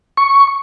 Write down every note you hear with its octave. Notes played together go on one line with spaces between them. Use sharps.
C#6